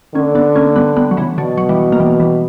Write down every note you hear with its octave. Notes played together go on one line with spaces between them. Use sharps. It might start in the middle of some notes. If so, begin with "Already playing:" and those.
D3 A#3 C#4
B3 D4
A#3 C#4
G3 B3
G3 B3
F#3
C#3 E3
B2 D3 F#3
F#3
E3 G3
A#3
E3 G3
E3 G3